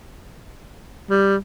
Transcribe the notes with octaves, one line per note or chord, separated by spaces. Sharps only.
G3